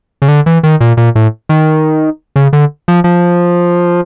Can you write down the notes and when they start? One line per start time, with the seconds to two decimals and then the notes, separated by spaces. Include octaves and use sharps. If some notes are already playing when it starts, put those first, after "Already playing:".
0.22 C#3
0.28 D3
0.46 E3
0.63 D#3
0.81 A#2
0.97 A#2
1.15 A2
1.49 D#3
2.36 C#3
2.53 D3
2.88 F3
3.04 F3